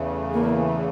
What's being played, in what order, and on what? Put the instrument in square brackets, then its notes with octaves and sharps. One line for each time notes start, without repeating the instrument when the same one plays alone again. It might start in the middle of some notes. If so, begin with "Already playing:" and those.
Already playing: [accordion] E2 C#3 E3 A3
[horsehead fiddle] A#3